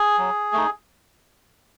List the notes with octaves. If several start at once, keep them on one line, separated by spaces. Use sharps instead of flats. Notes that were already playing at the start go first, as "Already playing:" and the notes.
Already playing: G#4
F#3
A3 D#4